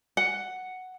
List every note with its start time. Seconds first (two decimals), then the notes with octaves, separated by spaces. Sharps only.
0.17 F#5